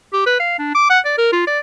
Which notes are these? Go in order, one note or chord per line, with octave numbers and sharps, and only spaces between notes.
G4
B4
F5
D4
D6
F#5
D5
A#4
F4
D5